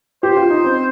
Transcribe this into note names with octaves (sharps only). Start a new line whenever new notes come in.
G4 C5
F4
D#4
C4